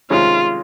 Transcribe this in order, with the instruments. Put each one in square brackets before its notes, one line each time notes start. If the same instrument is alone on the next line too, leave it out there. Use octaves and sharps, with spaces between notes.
[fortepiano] C3 D#3 G#3 C#4 [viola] F4